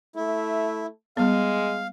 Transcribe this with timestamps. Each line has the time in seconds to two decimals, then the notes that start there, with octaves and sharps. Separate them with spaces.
0.16 A3 E4
1.17 G3 G#3 B3 F5